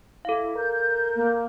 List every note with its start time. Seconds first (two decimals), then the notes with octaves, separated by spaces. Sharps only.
0.25 E4 A4 F5
0.56 A#4 G6
1.16 A#3